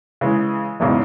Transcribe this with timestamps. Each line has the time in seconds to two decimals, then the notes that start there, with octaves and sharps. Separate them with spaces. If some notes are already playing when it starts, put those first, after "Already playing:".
0.21 C#3 E3 G#3
0.80 B1 E2 G#2 C#3 E3